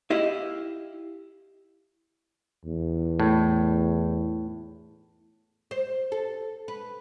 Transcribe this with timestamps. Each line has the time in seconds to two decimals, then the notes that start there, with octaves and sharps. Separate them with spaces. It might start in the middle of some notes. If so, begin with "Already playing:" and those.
0.10 E4 G4 D#5 F5
2.65 E2
3.20 A2
5.71 C5
6.12 A4
6.68 B4